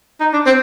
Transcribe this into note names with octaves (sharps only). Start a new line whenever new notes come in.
D#4
D4
C4